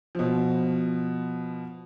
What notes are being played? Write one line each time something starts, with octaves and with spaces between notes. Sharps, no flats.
B2 F3